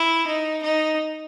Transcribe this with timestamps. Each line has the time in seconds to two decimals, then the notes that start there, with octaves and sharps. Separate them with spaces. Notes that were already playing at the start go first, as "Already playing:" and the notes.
Already playing: E4
0.27 D#4
0.62 D#4